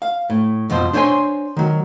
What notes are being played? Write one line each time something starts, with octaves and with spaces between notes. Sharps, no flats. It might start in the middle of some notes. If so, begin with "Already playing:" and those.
F5
A2
F2 B2 F4 C5
D4 C5 C#5 F5 G#5 C6
D#3 F#3